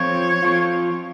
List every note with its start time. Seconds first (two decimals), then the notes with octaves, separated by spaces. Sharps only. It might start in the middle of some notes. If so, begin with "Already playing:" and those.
Already playing: F3 C4 F4 C#5
0.43 F3 C4 F4